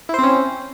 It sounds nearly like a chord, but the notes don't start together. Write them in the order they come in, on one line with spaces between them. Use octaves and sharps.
E4 C5 C4 C#4